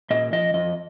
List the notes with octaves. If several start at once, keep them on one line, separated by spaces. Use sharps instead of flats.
A#2 D#5
F3 D#5
F2 D#5